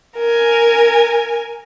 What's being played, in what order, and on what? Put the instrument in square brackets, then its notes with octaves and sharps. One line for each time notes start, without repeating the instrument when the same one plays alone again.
[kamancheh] A#4 G#5